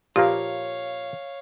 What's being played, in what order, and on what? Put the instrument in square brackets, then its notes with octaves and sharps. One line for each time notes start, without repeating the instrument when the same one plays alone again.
[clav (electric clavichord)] A#2 F3 A#3 [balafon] G4 [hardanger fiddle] C#5 F5